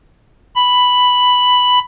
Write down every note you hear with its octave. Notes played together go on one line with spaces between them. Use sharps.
B5